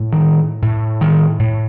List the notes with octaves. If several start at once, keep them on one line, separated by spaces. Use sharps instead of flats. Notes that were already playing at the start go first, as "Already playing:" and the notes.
Already playing: A2
D#3
A2
D#3
A2